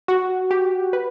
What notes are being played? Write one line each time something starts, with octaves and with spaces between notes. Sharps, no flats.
F#4
G4
B4